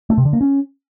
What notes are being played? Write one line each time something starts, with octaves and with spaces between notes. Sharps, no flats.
A3
C3
D3
A#3
C#4